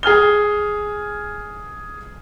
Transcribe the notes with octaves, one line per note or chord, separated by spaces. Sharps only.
G#4 G#5 F6 G7